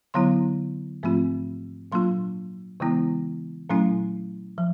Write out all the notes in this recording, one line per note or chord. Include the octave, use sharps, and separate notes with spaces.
D3 F#3 B3 E4 C6
G#2 F3 A3 C4 F4
A#2 F#3 A#3 D4 F4 C6
C#3 E3 G#3 B3 E4
A#2 F#3 A3 C#4 E4
F3